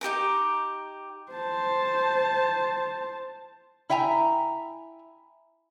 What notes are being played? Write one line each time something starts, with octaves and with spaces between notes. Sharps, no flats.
D#4 G4 A#4 A#5
C5 A5
E4 E5 G5 G#5 A#5